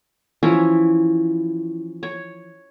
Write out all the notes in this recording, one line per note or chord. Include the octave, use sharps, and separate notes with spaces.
E3 F3 C#4 E4
C#5